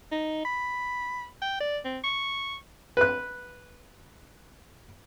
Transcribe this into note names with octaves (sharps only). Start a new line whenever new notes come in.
D#4
B5
G5
D5
C4
C#6
B4 F#6